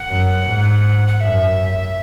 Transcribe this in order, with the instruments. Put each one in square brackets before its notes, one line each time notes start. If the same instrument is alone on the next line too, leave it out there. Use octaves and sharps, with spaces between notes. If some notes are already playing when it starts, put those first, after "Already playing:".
Already playing: [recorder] F#5
[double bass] F#2
G#2
[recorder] F#5
[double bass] F#2 [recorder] E5